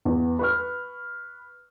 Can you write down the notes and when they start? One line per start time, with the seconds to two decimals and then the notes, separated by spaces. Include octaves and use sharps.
0.05 E2
0.39 B4 C#6 F6